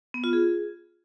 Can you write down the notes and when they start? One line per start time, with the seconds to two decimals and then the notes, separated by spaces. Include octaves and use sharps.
0.14 B3
0.24 F4
0.33 G#4